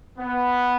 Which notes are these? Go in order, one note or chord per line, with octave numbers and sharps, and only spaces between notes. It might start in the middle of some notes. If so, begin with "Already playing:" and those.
B3